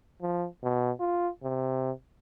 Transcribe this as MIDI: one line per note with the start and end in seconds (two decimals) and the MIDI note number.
0.22 0.47 53
0.63 0.92 47
1.00 1.28 65
1.43 1.91 48